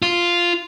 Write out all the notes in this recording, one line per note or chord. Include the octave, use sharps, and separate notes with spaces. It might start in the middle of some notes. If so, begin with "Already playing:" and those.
F4